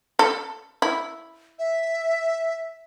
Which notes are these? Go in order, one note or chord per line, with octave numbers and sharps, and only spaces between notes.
A4
E4
E5